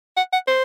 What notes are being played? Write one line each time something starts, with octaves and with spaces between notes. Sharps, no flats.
F#5
F#5
C5